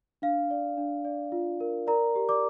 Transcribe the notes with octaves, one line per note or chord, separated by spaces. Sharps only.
D4 F5
D5
D4
D5
F4
A#4
A#4 D5 A#5
G4
D5 D6